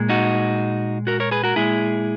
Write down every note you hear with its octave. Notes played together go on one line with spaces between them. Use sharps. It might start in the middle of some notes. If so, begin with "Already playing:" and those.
Already playing: A#2 G#3
D#4 F#4
F#4 A#4
A#4 C#5
G#4 B4
F#4 A#4
A#2 G#3 E4 G#4